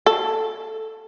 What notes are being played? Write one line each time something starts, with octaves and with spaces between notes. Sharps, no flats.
A4